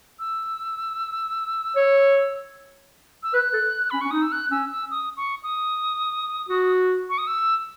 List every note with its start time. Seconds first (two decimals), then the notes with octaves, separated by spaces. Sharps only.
0.19 E6
1.76 C#5
3.23 E6
3.34 B4 F#6
3.53 A4
3.90 C#4 B5
4.01 C#4 C#6
4.11 D#4 D#6
4.22 E6
4.32 F#6
4.51 C#4 E6
4.71 E6
4.91 D#6
5.17 C#6
5.43 D#6
6.49 F#4
7.09 C#6
7.18 D#6
7.27 E6